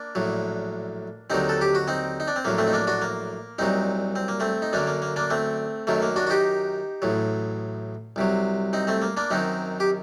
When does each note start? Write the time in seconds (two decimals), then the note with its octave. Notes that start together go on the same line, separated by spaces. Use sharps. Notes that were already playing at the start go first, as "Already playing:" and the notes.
Already playing: A#3 D4
0.15 A#1 A2 F#3
1.30 D#2 D3 F#3 C4 D#4
1.49 A4
1.61 G4
1.75 F#4
1.88 C4 D#4
2.20 D#4
2.28 D4
2.36 C4
2.45 A#1 A2 F#3 A#3
2.58 A3 C4
2.67 D#4
2.73 A#3 D4
2.87 D4 F#4
3.02 A#3
3.59 C2 A#2 F#3 C4 D#4
4.16 C4
4.28 A#3
4.40 A3 C4
4.62 D#4
4.73 F#2 D3 F#3 A#3 D4
4.87 A#3
5.02 A#3
5.16 A#3 D4
5.30 A3 C4
5.87 F#2 D#3 F#3 A3
6.02 A#3
6.16 D4 F#4
6.27 F#4
6.30 D#4 G4
7.02 A1 A2 F#3
8.16 C2 C3 F#3
8.73 C4 D#4
8.87 A3 C4
9.02 A#3
9.17 A#3 D4
9.30 F#2 D#3 F#3 C4 D#4
9.80 G4